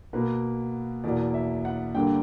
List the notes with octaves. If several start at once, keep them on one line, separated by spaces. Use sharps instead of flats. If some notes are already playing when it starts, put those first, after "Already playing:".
B2 A#3 B4
E2 B2 A#3 D5
E5
F#5
G2 D3 A#3 G5